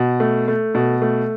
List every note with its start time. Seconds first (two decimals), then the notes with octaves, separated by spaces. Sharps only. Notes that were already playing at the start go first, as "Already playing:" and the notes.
Already playing: B2
0.20 A3
0.48 A3
0.75 B2
1.02 A3